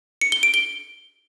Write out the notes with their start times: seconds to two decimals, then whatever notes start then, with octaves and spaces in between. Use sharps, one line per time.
0.21 C#7
0.32 G7
0.43 D7
0.54 G7